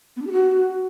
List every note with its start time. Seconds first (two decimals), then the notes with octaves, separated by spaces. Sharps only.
0.16 B3
0.22 D4
0.27 G4
0.32 F#4